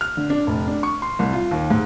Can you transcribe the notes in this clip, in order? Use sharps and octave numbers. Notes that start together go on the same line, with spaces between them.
F6
D3
D4
F1
D4
C#6
C6
C2
F4
D#2
G#2